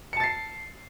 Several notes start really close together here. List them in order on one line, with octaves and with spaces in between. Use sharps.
C#7 A5 A6 C7